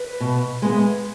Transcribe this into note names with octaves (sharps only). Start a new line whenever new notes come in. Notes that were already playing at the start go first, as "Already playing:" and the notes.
Already playing: B4
B2
G#3 B3